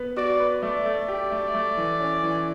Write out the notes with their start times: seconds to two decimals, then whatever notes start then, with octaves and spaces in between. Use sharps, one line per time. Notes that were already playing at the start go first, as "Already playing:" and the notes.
Already playing: B3 B4
0.17 F#4 D5
0.40 B4
0.62 A3 D5
0.86 A3
1.08 G4
1.31 A3
1.54 A3
1.77 E3
2.00 C#4
2.23 E3